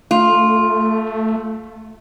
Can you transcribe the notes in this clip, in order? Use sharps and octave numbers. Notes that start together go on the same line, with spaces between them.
A3 F4